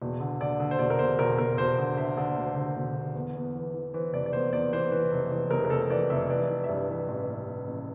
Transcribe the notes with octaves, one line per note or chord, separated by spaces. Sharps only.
E1
D3
D3 D5
D3
C5
E1 D5
A#4
E1 C5
E1 A#4
E1 A#4
E1 C5
D3
D3 E5
D3 D5
D2
D3
E1
D3
E2
E2
E3
E3
E3 C5
F1 D5
D5
E2 C5
E2 D5
E3 C5
E3
F1
E3
F1 A#4
A#4
F1 A4
E3 D5
F1 E5
E3 D5
E3
E5
G2 D5
E3
A1
A1
A1
A1